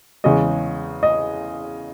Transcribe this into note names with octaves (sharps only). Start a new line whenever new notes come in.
E2 C#3 G#3 D#5
D#5